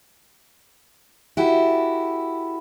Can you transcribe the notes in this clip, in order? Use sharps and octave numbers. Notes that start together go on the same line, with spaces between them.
E4 F#4 G4 A4